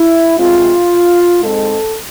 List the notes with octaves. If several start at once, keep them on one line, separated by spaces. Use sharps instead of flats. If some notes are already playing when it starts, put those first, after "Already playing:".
Already playing: E4
C3 G#3 C4 F4
G#2 G#3 C4 A4